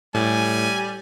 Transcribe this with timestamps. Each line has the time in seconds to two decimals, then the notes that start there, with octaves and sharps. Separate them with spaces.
0.15 A2 G3 G#5